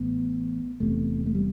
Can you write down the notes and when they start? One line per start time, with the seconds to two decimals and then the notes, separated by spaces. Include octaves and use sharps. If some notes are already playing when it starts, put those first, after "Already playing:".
Already playing: A1 A2 B3
0.80 E1 E2 C3 A3
1.26 A3
1.35 G3